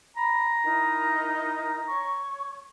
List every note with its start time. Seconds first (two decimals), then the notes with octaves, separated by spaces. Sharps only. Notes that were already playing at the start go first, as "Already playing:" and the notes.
0.16 A#5 B5
0.63 D#4 E4 A#4
1.88 C#5 C#6